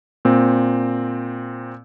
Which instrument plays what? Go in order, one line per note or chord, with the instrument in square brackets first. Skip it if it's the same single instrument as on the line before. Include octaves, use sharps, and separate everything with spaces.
[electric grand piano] A#2 C4